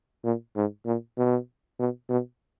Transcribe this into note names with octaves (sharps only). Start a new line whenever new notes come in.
A#2
G#2
A#2
B2
B2
B2